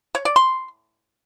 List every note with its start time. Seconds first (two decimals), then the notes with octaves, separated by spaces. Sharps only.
0.15 C#5
0.25 D5
0.36 C6